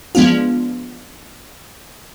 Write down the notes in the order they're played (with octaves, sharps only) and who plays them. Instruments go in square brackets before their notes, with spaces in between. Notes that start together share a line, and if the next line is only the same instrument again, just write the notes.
[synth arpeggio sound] F3 G#3 B3 D4 F4